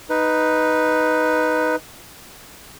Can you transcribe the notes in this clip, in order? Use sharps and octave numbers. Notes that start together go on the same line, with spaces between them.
D#4 B4